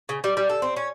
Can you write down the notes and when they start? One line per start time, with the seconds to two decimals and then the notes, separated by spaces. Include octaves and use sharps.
0.09 C#3
0.24 G3
0.37 G3
0.49 A4
0.62 C4
0.76 C#4